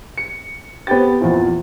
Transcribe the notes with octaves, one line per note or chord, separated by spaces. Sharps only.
C#7
B3 C4 G4 G5 A6
E2 A#2 F3 C4 E4